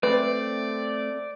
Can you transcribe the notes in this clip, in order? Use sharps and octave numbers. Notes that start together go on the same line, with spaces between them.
A3 C4 B4 D5